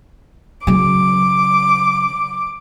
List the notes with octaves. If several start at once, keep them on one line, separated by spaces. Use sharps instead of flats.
C#3 F#3 D6